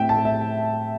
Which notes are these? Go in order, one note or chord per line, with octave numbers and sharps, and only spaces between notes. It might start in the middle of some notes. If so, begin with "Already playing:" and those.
Already playing: A2 C4 E4 E5 G5
A5
A2
E5